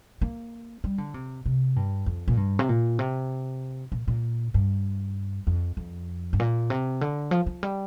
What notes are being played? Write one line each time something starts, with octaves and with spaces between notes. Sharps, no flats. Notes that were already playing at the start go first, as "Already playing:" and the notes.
A#3
G3
D3
C3
C3
G2
F2
A#2
G2
C3
A#2
C3
A#2
A#2
G2
F2
F2
G2
A#2
C3
D3
F3
F3
G3